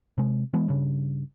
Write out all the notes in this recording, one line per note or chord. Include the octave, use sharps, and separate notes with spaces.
C3 G#3
E3 G#3 B3
G2 C#3